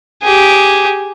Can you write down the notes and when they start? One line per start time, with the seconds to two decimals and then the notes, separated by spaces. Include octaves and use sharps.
0.23 G4 G#4